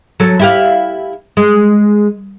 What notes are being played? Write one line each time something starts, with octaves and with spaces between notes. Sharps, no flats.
F#3 A4
E4 G4 F5
G#3